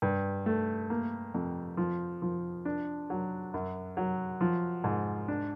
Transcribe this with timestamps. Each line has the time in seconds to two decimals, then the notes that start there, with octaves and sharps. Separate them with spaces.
0.02 G2
0.46 A3
0.90 A#3
1.34 F2
1.77 F3
2.22 F3
2.65 D4
3.10 F#3
3.54 F#2
3.97 F#3
4.41 F3
4.84 G#2
5.28 D4